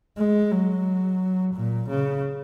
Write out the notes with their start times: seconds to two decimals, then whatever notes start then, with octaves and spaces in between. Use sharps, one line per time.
0.18 G#3
0.52 F#3
1.55 A#2
1.90 C#3